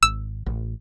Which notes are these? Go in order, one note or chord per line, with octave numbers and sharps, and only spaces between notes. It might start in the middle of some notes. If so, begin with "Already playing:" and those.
G#1 E6
A1